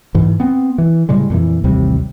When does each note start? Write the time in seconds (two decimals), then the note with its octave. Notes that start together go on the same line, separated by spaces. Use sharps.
0.15 G#2 E3
0.40 B3 C4
0.78 E3
1.09 A2 C#3 G3 G#3
1.30 F2 A#2 E3
1.64 A1 D#2 C3 G3